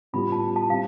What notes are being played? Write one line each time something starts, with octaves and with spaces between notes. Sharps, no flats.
A2 G3 B3 F4 B5
A5
A5
G3 C4 F5